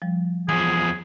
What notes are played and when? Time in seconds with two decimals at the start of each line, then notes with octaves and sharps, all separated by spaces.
0.02 F3 G3
0.49 E2 F3 G#4 G#5